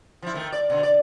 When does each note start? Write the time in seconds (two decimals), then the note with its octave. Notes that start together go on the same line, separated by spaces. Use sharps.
0.22 F3 E4
0.34 D#3 A3
0.52 D5
0.70 B2 D3
0.83 D5